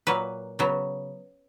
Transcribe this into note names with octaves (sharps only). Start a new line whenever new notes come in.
A#2 F#3 A#3 B4
C#3 F#3 B3